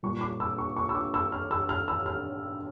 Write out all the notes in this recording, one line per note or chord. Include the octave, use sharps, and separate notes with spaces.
A#2 G3 A#3 C#6
D6
E6
C#6
C#6
E6
D6
E6
F6
E6
F6
E6
F6